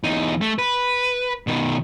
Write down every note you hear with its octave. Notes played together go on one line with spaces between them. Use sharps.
E2 D#4
A3
B4
B2 D#3